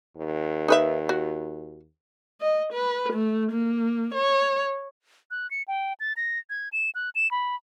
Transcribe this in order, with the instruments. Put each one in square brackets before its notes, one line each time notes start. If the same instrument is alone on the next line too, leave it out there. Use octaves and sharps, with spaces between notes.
[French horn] D#2
[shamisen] D#4 B4 E5
F#4
[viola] D#5
B4
A3
A#3
C#5
[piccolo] F#6
C#7
G5
A6
A#6
G#6
E7
F#6
E7
B5